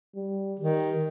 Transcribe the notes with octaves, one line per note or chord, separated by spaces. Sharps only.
G3
D#3 G4